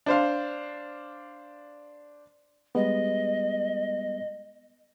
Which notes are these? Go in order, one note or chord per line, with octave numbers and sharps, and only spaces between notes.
D4 C5 F5
G3 G#3 B3 D#5